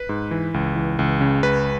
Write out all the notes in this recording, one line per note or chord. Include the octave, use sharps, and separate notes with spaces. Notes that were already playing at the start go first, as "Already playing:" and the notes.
Already playing: B4
G#2
E3
C#2
E3
C#2
C#3
C#2 B4